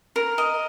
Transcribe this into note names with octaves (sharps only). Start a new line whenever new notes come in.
A#4
D#5